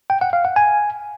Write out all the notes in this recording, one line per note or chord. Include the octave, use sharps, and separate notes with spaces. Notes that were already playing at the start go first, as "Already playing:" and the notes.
G5
F#5
F5
F#5
G#5